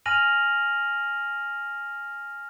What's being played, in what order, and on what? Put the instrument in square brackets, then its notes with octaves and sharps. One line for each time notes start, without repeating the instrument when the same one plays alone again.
[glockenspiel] G#5 F6 A#6 D#7 F7 F#7